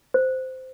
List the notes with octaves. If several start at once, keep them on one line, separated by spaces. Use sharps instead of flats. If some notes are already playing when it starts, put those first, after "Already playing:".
C5